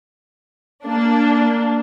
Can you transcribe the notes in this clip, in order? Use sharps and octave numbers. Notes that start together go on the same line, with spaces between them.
A#3 D4